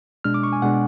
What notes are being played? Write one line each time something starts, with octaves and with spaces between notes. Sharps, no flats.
B2 G#3 D4 F6
D6
C#6
G#5
B2 G#3 D4 F#5